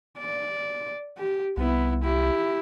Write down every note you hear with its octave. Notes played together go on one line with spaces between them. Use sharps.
D5
G4
C2 B3 E4
E4 G4